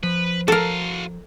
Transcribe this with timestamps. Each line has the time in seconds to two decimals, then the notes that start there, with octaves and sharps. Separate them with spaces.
0.03 F3 B4
0.48 F#4 A4 A#4 F5